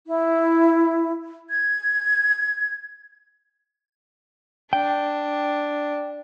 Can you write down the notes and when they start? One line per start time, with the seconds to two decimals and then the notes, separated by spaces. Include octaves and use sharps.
0.06 E4
1.49 G#6
4.73 D4 G5